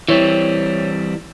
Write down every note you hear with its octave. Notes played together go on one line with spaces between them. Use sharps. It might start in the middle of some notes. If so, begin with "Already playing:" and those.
E3 G3 C4 E4 C#5